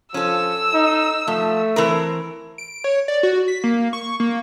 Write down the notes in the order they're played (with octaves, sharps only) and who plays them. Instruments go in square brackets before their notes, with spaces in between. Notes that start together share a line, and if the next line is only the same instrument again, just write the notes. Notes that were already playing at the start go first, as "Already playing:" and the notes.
[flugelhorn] F3 [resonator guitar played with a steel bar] C#4 A4 [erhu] E6
[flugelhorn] D#4
[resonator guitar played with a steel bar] F3 [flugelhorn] A3
[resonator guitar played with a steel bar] E3 C4 A#4
[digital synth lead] D7
C#5
D5
F#4
B6
A#3
C#6
A#3